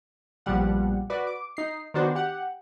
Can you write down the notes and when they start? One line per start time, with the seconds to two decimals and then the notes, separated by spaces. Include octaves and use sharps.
0.46 A#1 B2 F3 G3 F#5
1.10 F#4 B4 D5
1.27 D6
1.57 D#4 C7
1.94 D#3 B3 D4 F#4 C5
2.15 G4 F#5